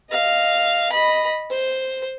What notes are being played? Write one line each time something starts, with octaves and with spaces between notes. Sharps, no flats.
D#5 F5
D#5 B5
C5